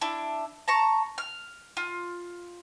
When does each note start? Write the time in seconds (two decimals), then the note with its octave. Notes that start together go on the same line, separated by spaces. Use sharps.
0.01 D4 E4
0.68 A5 A#5 C#6
1.18 F6
1.77 F4